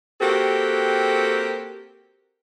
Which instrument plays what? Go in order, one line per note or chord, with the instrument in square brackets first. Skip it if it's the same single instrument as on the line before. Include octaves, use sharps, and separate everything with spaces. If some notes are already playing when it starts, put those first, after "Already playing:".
[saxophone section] A#3 C4 F#4 G4 A4